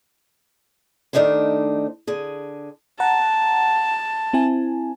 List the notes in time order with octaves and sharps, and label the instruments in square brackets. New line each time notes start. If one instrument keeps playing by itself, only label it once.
[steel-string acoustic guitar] D#3 A3 D4 D#4 G4 C5
D3 G#4
[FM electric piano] F#5 A#5 [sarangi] A5
[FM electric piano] C4 E4 G#5